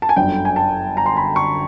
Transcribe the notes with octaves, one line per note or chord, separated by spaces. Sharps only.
A5
G#5
G1 F#2 D3 G5
G#5
A5
A#5
C6
B5
C#6